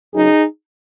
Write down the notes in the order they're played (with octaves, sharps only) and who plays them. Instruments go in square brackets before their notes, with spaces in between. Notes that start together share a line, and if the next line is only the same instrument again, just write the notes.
[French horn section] F#2 C#3 F#3 D#4 G#4